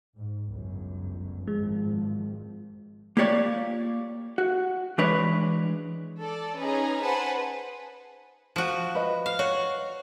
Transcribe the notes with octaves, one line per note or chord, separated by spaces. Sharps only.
G#2
G1 C#2 F#2
G#1 G2 F3 G#3
A#3 F4 G4 C#5 D5
F#4
E3 G#3 D4 B4 C#5
A4 D5
C#4 D#4 G#4 B4 G#5 A#5
B4 C5 F#5 G#5 A5 B5
F3 F#4
B4 D#5
F5
F#4 C#5